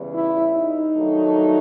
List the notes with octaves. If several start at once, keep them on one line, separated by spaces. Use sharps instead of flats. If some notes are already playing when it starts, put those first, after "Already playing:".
Already playing: E2 C#3 E3 G3
E4
D#4
G2 D#3 F#3 A3